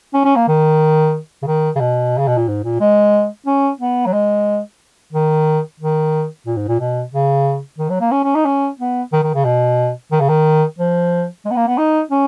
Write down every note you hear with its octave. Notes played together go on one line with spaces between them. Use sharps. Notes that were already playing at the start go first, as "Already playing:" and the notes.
C#4
C#4
A#3
D#3
C#3
D#3
C#3
B2
C#3
B2
A#2
G#2
A#2
G#3
C#4
B3
F#3
G#3
D#3
D#3
A#2
G#2
A#2
B2
C#3
D#3
F#3
A#3
C#4
C#4
D#4
C#4
B3
D#3
D#3
C#3
B2
D#3
C#3
D#3
F3
G#3
B3
A#3
B3
D#4
C#4